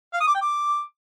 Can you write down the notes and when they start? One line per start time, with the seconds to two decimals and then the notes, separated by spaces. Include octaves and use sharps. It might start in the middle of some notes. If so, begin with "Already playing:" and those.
0.13 F5
0.20 D#6
0.27 D6
0.34 G5
0.41 D6